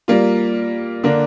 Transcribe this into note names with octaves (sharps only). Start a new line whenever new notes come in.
G3 A#3 F4
D3 A#3 D4